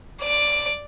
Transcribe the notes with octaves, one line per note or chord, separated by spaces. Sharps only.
D5 D7